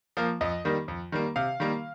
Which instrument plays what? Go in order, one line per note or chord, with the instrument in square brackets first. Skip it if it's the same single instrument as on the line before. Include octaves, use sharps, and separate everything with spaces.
[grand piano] F3 A#3 F5
F2 D#5
D#3 G3 A#3
F2
D#3 G3 A#3
C3 F5
D#3 G3 A#3